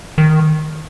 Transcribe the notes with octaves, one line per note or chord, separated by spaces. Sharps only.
D#3